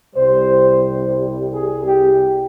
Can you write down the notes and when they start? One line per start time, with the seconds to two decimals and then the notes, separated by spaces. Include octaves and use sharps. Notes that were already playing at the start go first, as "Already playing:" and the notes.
0.14 C2 C3 G3 C5
1.53 G#4
1.87 G4